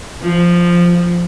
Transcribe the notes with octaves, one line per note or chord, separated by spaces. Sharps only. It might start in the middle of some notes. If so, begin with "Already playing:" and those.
F3